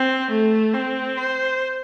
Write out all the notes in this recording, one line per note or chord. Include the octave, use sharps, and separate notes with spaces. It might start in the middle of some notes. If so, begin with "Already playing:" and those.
Already playing: C4
A3
C4
C5